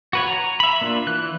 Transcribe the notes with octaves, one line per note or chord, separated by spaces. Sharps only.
F#4 B4 C#5
A#5
E5 B5
A#3 D4 F4
E3 F#6